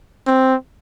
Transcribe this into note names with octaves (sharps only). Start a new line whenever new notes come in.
C4